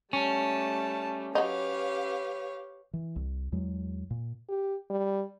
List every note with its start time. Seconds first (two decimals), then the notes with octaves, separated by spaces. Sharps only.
0.13 G3 A3 C#4 A5
1.35 F#3 D#4 G4 B4 C#5 F5
2.93 E3
3.16 C2
3.52 E2 F#3 G#3
4.10 A#2
4.49 G4
4.90 G3